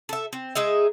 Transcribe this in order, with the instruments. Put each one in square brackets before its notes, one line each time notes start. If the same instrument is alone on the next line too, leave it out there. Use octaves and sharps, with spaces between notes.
[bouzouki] A4 E5
C4
G#3 D#4 G#4 E5